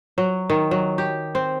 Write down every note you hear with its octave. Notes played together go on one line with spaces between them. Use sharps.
F#3
D#3
F#3
G4
C4